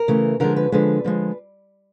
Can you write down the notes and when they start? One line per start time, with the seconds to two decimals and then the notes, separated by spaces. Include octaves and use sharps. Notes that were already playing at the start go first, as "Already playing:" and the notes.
Already playing: A#4
0.08 C#3 E3 A3
0.40 D3 F3 G#3 A#4
0.56 B4
0.72 D3 F3 G#3 B4
1.04 D3 F3 G#3